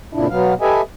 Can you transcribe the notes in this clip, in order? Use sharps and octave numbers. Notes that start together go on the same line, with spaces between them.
F2 A#2 C#3 F3 D4 E4
B2 F#3 B3 F5
G4 A4 B4 D#5 E5 G#5